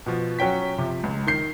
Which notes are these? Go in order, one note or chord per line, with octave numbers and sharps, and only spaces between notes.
B2 F3
F#3 C#4 G5 B6
C3 F3
C#2
D#3 G6 C7